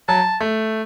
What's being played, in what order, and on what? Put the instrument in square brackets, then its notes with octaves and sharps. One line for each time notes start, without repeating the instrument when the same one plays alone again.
[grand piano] F#3 [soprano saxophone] A5
[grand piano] A3